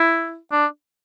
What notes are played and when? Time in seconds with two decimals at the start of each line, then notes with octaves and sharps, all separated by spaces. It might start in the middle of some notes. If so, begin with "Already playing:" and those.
Already playing: E4
0.52 D4